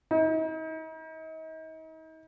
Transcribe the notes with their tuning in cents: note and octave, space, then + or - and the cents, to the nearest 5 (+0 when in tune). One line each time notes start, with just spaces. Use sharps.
D#4 +40